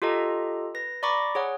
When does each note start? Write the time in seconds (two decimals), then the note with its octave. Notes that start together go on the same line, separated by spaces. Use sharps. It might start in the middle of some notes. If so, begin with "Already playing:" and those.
0.02 F4 G4 A4 D#5 A#5
0.75 B4 A#6
1.03 D5 A#5 B5 C#6 D6 A#6
1.35 G#4 C#5 F#5